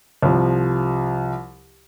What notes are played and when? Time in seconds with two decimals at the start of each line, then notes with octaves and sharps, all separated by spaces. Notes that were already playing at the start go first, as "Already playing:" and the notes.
0.23 C2 F3